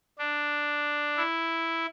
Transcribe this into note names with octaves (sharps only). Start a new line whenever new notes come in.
D4
E4